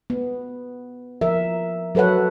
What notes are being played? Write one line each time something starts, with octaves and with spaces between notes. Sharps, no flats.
B3
F3 A#4 E5
F#3 A4 B4 C#5 F#5